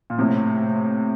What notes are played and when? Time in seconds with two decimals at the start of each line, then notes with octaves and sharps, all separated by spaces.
0.10 A#2
0.19 A2 C3